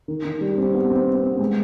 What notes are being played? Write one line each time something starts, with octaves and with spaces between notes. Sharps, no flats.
D#3
D#3
G3
C4
B3
C4
B3
G#3